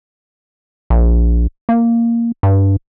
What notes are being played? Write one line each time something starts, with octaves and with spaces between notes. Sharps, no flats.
A#1
A#3
G2